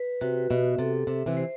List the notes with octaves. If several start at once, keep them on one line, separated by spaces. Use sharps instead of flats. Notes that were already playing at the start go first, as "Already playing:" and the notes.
Already playing: B4
C3 F#4
B2 E5
C3 A4
C3 E5
C3 E3
C5